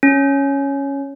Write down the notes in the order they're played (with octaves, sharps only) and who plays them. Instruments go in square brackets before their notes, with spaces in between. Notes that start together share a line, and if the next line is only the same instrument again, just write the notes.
[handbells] C#4